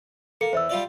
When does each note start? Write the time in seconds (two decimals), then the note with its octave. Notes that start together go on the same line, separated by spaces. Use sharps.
0.41 A#3 A4 C#7
0.53 E2 C5 E5 E6
0.69 G3 F4 D5